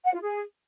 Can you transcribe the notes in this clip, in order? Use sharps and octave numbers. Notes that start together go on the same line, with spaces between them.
F#5
F4
G#4